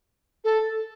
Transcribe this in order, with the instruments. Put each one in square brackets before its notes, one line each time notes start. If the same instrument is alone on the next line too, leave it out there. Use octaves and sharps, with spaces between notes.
[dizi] A4